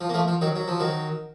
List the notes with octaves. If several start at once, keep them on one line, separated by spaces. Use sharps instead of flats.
F3
A#3
F3 A3
F3
D#3 F#3
F#3
F3
D#3 F#3